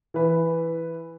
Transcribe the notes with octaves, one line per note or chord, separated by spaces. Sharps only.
E3 B4